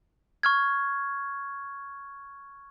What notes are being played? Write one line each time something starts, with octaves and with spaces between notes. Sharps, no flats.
C#6 F6 G#6